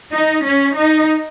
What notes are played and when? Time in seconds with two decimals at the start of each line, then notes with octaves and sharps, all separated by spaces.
0.12 D#4
0.45 C#4
0.76 D#4